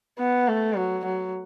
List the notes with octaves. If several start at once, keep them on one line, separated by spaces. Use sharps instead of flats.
B3
A3
F#3
F#3